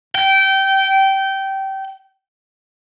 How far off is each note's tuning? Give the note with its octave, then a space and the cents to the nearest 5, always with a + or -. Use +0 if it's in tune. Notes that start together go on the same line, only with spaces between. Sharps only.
G5 -20